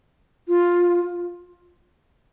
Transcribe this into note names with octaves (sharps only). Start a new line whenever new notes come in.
F4